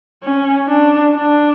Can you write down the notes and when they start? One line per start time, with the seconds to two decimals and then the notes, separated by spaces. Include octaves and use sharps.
0.23 C#4
0.68 D4
1.12 D4